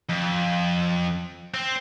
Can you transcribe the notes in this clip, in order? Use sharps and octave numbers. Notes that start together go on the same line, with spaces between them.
F2
C4